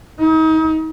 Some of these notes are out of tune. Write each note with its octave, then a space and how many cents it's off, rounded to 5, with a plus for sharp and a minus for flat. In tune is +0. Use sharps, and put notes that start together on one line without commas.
D#4 +35